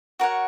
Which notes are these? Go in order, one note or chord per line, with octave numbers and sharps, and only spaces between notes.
F#4 A#4 C#5 F#5